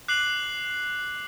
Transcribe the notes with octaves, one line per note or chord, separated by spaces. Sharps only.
D6 F#6 C7 F#7